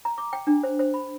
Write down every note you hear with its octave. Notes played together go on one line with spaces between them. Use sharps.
A#5
D6
G5
D4
C5
C5
B5